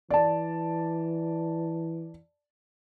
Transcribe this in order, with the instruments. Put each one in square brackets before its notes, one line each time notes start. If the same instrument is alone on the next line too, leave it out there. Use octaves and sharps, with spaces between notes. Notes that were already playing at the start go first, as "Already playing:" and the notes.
[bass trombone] E3 [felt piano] D5 A5